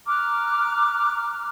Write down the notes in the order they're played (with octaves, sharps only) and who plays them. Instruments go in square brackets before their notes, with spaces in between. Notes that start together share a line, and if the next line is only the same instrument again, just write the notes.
[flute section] A#5 D6 F6 F#6